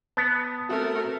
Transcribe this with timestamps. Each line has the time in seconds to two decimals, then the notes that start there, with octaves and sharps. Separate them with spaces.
0.17 B3 A5 D#6
0.69 A3 C4 F#4 A#4